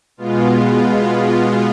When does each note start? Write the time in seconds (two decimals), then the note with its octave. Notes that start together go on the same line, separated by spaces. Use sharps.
0.17 B2 G#3 B3 F4